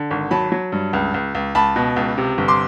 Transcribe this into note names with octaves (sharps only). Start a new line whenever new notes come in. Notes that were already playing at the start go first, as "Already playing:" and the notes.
Already playing: D3
G#1
F#3 A5 B5
F#3
G2
C#2
C#2
C#2
C#2 A5 B5
B2
C#2
C3
G1
C6 D6